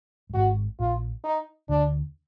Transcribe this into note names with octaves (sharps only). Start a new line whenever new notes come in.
F#2
G#1 G#2 F#4
A#1 A#2 F4
D#4
D2 D3 D4